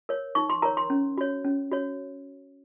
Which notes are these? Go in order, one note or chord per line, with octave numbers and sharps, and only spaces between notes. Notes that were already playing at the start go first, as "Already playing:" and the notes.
A#4 C#5
D#4 C#6
C6
A#4 C#5 A#5
C6
C#4
F#4 C#5
C#4
F#4 C#5